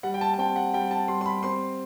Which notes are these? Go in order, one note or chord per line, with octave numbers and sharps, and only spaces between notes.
G3 F#5
G5
A5
A5
C4 G5
F#5
G3 G5
A5
G3 C6
C6
B5
C4 C6